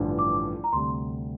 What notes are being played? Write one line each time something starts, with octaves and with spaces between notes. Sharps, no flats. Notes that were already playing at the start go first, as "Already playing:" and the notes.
Already playing: A1 G2 D3 F3
D6
A#5
D2 C3 G3 C6